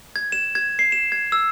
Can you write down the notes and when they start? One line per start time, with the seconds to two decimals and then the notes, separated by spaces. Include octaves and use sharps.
0.16 G#6
0.32 E7
0.55 G#6
0.79 C7
0.92 E7
1.12 G#6
1.32 E6